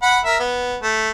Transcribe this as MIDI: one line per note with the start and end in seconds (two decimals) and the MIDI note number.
0.03 0.20 78
0.03 0.20 83
0.25 0.38 70
0.25 0.38 76
0.40 0.77 59
0.83 1.10 57